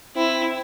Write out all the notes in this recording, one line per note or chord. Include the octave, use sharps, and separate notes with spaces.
C4 E4